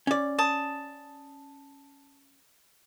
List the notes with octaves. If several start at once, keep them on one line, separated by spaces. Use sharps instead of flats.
C#4 D5
A5 D#6